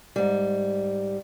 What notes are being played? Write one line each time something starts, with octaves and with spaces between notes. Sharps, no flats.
G#2 G3